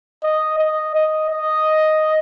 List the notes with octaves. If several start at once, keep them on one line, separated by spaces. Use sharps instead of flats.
D#5
D#5
D#5
D#5